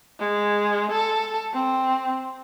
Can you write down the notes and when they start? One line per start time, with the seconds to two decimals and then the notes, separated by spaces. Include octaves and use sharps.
0.20 G#3
0.92 A4
1.53 C4